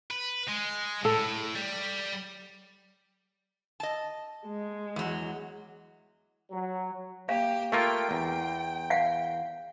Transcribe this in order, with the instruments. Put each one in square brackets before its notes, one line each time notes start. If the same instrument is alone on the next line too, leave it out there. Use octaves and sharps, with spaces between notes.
[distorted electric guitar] B4
G#3
[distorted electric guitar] A2 [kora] A4
[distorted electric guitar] G3
[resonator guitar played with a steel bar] D#5 A5
[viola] G#3
[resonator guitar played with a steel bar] E2 F#3
[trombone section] F#3
[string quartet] A#3 G4 [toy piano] F5
[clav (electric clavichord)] A3 A#3 F4 [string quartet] G5
[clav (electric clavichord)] E2
[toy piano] F5 F#5